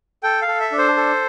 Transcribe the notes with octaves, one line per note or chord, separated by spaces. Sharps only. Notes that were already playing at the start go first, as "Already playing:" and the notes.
A4 G5
F5
A4
E5
D4
C5
A4